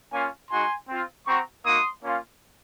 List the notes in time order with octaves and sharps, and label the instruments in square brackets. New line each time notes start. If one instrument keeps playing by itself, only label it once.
[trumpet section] A#3 C#4 F4 F5 G#5
G#3 D#4 F#4 G#5 C6
C4 F4
C4 F#4 A#5 C#6
A#3 D#4 F#4 C6 D#6
A#3 C#4 F4